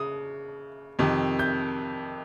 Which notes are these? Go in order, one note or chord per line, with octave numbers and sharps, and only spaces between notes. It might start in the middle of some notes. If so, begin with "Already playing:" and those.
Already playing: C#3 D#6
F2 C3 D#3
G6